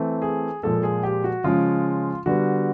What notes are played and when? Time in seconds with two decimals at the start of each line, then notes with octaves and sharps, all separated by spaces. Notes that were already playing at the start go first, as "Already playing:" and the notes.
Already playing: E3 A3 C4
0.22 G#4
0.63 A#2 F3 G#3 A4
0.83 G#4
1.03 G4
1.24 F#4
1.44 C#3 F3 G#3 C#4 F4
2.26 D3 G3 B3 F#4